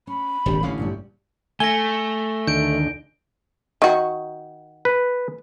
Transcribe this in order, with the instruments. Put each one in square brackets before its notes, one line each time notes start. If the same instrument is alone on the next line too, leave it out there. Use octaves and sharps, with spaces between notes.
[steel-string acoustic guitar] C#4 [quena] B5
[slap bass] D#1 G#1 [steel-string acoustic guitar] D3 G4
[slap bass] A1 D3 C#4 [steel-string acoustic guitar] F5
[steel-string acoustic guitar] G2 A#2 G3
[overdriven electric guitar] A3 [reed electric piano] G#5 [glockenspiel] A#6 G7
[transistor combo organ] D2 D3 D#3 [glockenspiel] G6 D7
[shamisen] D#3 F#4
[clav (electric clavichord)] B4